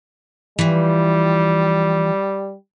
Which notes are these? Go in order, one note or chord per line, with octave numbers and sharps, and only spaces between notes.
E3 F3 G3